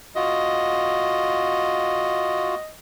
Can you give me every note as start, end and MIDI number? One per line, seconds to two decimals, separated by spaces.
0.16 2.55 65
0.16 2.55 66
0.16 2.72 75